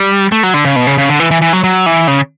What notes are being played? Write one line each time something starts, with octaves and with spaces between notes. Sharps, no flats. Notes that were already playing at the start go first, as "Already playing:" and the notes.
Already playing: G3
A3
F#3
D3
C#3
B2
C#3
C#3
D3
E3
E3
E3
F#3
F#3
E3
C#3